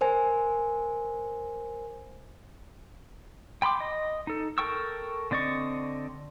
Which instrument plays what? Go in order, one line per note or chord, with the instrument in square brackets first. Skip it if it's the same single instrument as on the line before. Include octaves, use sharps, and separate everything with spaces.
[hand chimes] A#4 C5 G#5
[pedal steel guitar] G5 B5 C6 D6
D#5
D#4 A4
A4 A#4 G5 C#6 E6
D3 C4 D5 D#5 C#6